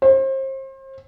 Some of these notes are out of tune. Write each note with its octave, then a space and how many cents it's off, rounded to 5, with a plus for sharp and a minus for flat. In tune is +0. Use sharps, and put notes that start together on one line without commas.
C5 +35